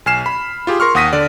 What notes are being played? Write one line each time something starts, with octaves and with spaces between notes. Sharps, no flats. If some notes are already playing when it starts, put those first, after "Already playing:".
B1 G#5 F6 C7 E7
B5
F4 G4 G#4
A#4 C6 C#6 F6
D#2 F#5 D#6 A#6 B6 D#7
D3 D5